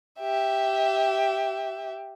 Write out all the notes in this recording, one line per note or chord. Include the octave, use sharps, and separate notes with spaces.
G4 E5